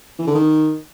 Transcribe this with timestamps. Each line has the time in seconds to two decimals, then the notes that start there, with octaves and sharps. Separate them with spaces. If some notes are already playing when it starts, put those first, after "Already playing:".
0.19 E3
0.27 D3
0.35 D#3